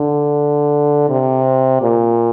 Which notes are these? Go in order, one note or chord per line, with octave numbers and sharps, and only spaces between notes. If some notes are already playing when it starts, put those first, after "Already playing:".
Already playing: D3
C3
A#2